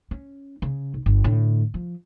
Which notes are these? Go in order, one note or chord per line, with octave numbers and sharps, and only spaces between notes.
C#4
C#3
B1
G1
A2 D3
F3